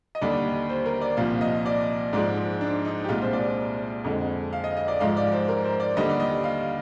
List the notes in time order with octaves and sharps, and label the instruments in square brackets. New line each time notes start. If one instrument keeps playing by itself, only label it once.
[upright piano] D#5
D#2 D3 G3 D5
C5
A#4
D5
C2 A#2 F3 F5
D#5
D5
G#2 F3 G#3 D5
D4
D#4
G4
C2 A#2 G#3 F4
C5
D5
F2 D3 G#3
F5
D#5
D#5
D5
G#2 F3 G#3 F5
D5
C5
A#4
C5
D5
D#2 D3 G3 D#5
D5
D#5
F5